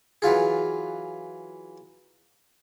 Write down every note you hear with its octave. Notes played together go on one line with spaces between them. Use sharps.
E3 F#3 F4 G#4